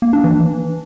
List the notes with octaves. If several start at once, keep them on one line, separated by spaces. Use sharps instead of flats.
A#3
D4
E3